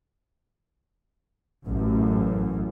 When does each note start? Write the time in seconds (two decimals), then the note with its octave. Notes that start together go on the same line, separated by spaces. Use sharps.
1.66 A1 F#2